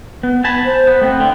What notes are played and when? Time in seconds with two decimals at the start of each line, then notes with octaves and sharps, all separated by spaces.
0.23 B3
0.44 G#5 A5 B5
0.65 C5
0.87 B3
1.02 A3 B3 C4 G5
1.20 D3 G5